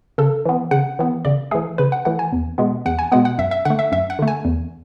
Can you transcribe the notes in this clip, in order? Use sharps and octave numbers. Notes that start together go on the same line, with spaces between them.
C#3 A4
E3 B3
C#3 F#5
E3 B3
C#3 D5
E3 A3 G#4
C#3 B4
F#5
E3 A3 F#5
G#5
E2
B2 G#3 B3
E2 F#5
G#5
B2 G#3 B3 F#5
F#5
F#2 E5
E5
D3 A3 F#5
E5
F#2 E5
F#5
D3 A3
G#5
E2